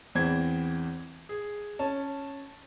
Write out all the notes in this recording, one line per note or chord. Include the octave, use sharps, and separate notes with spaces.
E2 E3 C4 G#6
G#4
C#4 A5